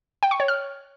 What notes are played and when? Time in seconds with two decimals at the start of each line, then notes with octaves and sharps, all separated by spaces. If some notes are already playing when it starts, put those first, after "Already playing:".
0.23 G5
0.31 C#6
0.40 C#5
0.48 F6